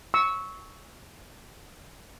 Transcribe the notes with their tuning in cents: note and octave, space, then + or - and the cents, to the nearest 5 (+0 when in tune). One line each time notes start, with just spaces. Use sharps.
C#6 +0 E6 -20